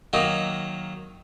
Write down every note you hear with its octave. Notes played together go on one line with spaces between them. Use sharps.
D#3 F#3 A#3 D#4